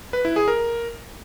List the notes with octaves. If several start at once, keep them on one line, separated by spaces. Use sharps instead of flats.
B4
E4
G#4
A#4